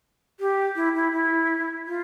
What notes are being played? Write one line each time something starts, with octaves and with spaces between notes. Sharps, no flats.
G4
E4
E4
E4
F4